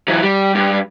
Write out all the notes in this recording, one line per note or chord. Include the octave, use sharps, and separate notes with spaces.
E3 F#3
G3
G2